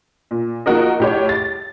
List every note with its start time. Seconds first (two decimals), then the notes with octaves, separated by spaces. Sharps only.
0.31 A#2
0.66 F3 A#3 D#4 F#4 A#4 D#5
1.00 A2 G4 C#5
1.29 A6